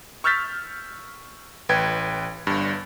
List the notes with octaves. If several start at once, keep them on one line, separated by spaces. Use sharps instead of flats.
C#6 E6 F6 G6 A6 B6
A1 B4 G5 G#6
G1 G2